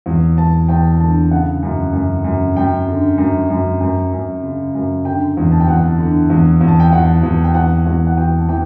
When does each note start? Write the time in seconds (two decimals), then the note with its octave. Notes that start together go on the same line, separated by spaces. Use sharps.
0.06 E2
0.37 E2 A5
0.68 E2 G5
1.00 D3 A5
1.31 C#3 F#5
1.62 F#2
1.93 F#2
2.24 F#2
2.56 F#2 G5
2.87 D3
3.18 F#2
3.50 F#2
3.80 F#2
4.12 F#2
4.42 C#3
4.75 F#2
5.05 D3 G5
5.37 E2
5.52 A5
5.60 G5
5.67 E2 F#5
5.98 D3
6.30 E2
6.61 E2
6.68 A5
6.80 G5
6.92 E2 F#5
7.23 E2
7.44 G5
7.54 E2 F#5
7.85 E2 F#5
8.07 F#5
8.17 E2 G5
8.37 A5
8.49 E3 G5